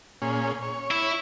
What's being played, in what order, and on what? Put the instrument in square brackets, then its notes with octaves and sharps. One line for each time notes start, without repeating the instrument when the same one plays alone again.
[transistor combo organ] A#2 C#4 G#4
C#5
[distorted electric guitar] E4